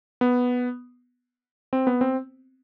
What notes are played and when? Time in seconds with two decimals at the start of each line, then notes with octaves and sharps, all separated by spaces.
0.21 B3
1.73 C4
1.87 B3
2.01 C4